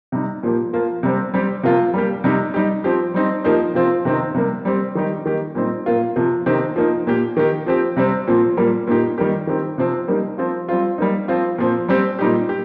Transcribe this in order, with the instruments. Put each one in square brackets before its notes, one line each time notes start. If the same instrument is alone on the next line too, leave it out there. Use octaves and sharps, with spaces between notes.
[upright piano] C3 G3 D#4
A#2 F3 A#3 G4
F3 A#3 F4
C3 G3 C4
G3 C4 G4
C3 F3 A#3 F4
G3 A#3 G4
C3 G3 D#4 G4
G3 D#4 G4
F3 C4 G4
G3 C4 D#4
F3 A#3 D#4 G4
C3 F3 C4 F4
C3 D#3 C4 D#4
C3 G3 A#3
G3 C4 G4
D#3 G3 D#4 G4
D#3 A#3 G4
A#2 G3 C4 D#4
A#2 A#3 F4
C3 F3 A#3
C3 D#3 C4 D#4 G4
F3 A#3 D#4
A#2 A#3 G4
D#3 A#3 G4
F3 C4 G4
C3 G3 C4
A#2 F3 C4
A#2 G3 A#3
A#2 A#3 D#4 G4
D#3 G3 A#3 G4
D#3 C4 D#4 G4
C3 F3 C4
G3 A#3 D#4 G4
F3 C4 F4
G3 C4 F4
G3 A#3 D#4
F3 C4 F4
A#2 F3 C4
G3 C4 G4
A#2 G3 D#4 G4
G4